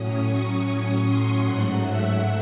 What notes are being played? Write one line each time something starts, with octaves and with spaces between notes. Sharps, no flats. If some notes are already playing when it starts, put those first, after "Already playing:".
Already playing: A2 F#3 C#4 D#6
C#6
C6
G#2 F#3 A3 F#5
E5